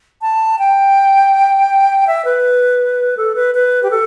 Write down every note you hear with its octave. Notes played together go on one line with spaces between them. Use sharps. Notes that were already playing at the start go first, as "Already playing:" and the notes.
A5
G5
E5
B4
A4
B4
B4
G4
A4